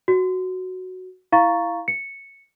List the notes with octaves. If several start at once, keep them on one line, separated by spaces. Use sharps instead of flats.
F#4
E4 F5 A#5 C#6 A6
C#7